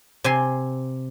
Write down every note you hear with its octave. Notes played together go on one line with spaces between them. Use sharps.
C3 G#5 C6